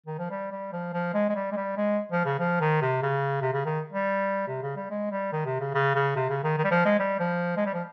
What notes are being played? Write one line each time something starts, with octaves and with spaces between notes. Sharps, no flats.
D#3
F3
G3
G3
F3
F3
G#3
G#3
G3
G#3
G3
G#3
F3
C#3
F3
D#3
C3
C#3
C3
C#3
D#3
G3
C3
C#3
G3
G#3
G3
D#3
C3
C#3
C#3
C#3
C3
C#3
D#3
D#3
G3
F3
G#3
G3
F3
G#3
G3
F3